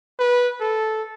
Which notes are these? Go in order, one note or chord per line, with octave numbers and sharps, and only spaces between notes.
B4
A4